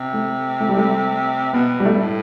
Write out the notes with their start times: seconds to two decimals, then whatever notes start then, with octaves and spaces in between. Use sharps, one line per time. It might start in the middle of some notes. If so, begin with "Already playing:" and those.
Already playing: C3
0.13 A3
0.60 A3
0.69 G3
0.77 A3
1.53 B2 B3
1.80 G3
1.85 A3
1.93 G2
2.00 A2